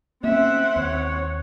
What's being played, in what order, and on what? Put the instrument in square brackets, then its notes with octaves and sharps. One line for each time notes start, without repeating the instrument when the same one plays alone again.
[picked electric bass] A#3 C#4 [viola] C4 F#5 [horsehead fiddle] E5
[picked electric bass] D#2 [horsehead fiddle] C#5